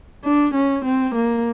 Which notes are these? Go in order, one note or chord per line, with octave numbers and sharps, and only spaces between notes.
D4
C#4
C4
A#3